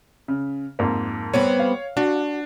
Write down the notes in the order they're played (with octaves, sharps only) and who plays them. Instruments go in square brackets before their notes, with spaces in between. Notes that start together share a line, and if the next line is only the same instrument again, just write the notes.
[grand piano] C#3
F2 G#2 A#3
[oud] G3 B3 C4 [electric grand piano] C#5
[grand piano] F5
[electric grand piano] D4 [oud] F#4